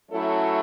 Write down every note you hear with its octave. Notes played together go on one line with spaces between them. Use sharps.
F#3 A3 C#4 E4 A4